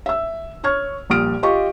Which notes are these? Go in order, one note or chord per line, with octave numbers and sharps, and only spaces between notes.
E5 E6
C#5 C#6 F6 G#6
A#1 A#2 G3 D#6 F6 D7
F4 G4 D#5 C#6